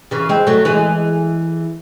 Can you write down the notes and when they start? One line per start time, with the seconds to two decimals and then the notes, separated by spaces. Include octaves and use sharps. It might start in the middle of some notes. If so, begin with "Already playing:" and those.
0.11 C#3 E3
0.29 G#3 C4
0.47 F#3 A3
0.65 E3 G#3